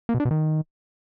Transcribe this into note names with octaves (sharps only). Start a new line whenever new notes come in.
A#3
B2
D4
B2
D#3